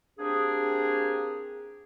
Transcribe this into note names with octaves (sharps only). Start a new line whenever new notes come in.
A#3 C4 D4 G4 G#4